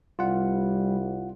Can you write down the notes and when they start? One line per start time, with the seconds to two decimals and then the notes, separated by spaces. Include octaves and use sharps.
0.19 C2 G3 F4 F#5